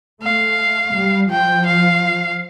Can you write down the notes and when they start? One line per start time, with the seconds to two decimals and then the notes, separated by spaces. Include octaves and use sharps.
0.22 A3 F5
0.94 G3
1.30 F3 G5
1.66 F5